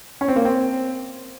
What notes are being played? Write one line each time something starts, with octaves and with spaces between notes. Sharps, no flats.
C#4
C4
A#3
C4